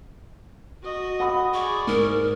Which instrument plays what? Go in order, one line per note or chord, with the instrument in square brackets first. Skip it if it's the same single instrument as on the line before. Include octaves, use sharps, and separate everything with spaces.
[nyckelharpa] F#4 D#5
[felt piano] F#5 B5 D#6
[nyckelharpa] G#4 D5 [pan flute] C#6
[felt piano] G#2 [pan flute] A#4